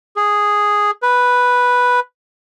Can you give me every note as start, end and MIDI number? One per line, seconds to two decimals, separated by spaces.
0.16 0.91 68
1.03 2.00 71